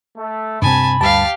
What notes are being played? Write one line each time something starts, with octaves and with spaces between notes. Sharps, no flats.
A3
G2 C3 C4 G#5 A5 B5
D2 G2 G4 F5 A5